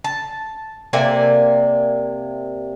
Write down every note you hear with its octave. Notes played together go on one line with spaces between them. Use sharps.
A5
C3 A#3 D5 G#5